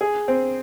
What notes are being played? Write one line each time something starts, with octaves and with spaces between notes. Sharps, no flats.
G#4
C4